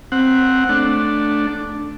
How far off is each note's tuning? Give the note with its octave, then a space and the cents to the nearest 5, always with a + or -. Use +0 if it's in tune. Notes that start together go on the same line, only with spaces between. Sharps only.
C4 +0 F#5 +0
A3 +0 D4 +0